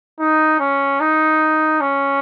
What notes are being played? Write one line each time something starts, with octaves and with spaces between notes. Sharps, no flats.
D#4
C#4
D#4
C#4